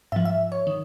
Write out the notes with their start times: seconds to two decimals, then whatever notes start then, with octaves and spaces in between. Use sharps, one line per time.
0.12 G#2 F3 E5
0.25 E5
0.52 C#5
0.67 D#3